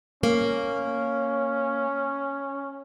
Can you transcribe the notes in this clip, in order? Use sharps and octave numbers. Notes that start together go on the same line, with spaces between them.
A#3 C#4